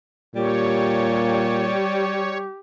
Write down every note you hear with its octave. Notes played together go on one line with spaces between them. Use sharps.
A#2 G3 G4 C#5